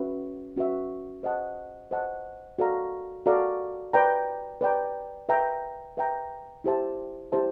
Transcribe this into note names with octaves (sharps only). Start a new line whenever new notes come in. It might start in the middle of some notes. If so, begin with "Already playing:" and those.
Already playing: C#4 F#4 B4 E5
C#4 F#4 B4 E5
C5 D#5 F#5 A5
C5 D#5 F#5 A5
F#4 A4 D5 F5 A#5
F#4 A4 D5 F5 A#5
B4 D5 G5 A#5
B4 D5 G5 A#5
B4 E5 G5 A#5
B4 E5 G5 A#5
E4 G4 C5 E5 A5
E4 G4 C5 E5 A5